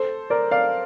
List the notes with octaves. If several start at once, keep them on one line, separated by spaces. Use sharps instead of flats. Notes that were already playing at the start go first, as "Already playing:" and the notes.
Already playing: A4 C5
A#4 D5
D5 F5